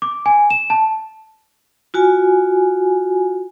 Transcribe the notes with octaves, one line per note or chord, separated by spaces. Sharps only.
D6
G#5
E7
A5
F4 F#4 G#5